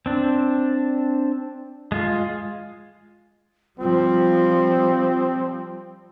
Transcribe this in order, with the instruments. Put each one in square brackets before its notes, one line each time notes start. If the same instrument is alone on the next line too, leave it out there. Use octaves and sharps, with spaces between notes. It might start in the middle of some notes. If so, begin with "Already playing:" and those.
[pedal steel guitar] C4 D4
G#3 F4
[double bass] F3 G3 [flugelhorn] C4 [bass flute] F4